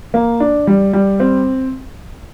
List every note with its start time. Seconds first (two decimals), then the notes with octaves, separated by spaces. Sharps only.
0.14 A#3
0.40 D4
0.67 G3
0.93 G3
1.20 C4